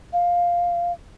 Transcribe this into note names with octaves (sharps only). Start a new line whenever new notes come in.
F5